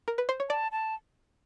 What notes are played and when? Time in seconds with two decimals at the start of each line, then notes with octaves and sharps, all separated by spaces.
0.08 A#4
0.18 B4
0.29 C5
0.40 C#5
0.50 D5 A5
0.72 A5